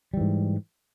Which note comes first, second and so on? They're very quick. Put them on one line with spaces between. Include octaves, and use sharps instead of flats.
G3 E3 G#2